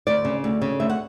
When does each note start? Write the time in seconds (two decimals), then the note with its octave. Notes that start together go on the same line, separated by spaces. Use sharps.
0.07 D2 D5
0.25 C#3
0.44 D2
0.61 C#3
0.80 D2 E5
0.90 F#5